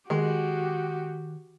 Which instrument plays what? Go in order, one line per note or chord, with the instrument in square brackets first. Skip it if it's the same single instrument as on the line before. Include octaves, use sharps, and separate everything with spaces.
[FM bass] D#3 [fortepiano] G#3 [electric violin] F#4 G4